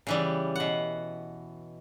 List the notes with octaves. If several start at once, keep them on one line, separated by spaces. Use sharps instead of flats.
C#3 E3 G3
B2 F#5